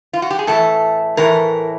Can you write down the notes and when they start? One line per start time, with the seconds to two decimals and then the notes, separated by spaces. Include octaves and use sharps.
0.13 F4
0.22 F#4
0.31 G4
0.39 G#4
0.47 A2 E3 A3 A4
1.17 A2 E3 A3 A#4